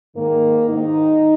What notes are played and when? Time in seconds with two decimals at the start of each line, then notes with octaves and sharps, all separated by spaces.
0.15 G#2 D#3 A#3
0.68 G#2 D#3 D#4